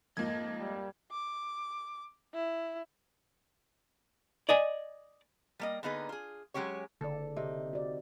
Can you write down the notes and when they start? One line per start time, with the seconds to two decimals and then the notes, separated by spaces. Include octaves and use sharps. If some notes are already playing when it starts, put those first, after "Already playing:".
0.17 F2 G#2 F3 A#3 D#5 G#6
0.60 G3
1.12 D6
2.34 E4
4.49 D5 D#5 G#5
5.60 G3 A#3 D#5
5.83 D3 A#3 B3 D#4 G#4 B4
6.09 F4 G#4
6.54 F#3 G#3 C#4 G4 C#5
7.01 F#1 D3 A4 D5
7.36 C3 D#4
7.73 F#4 D5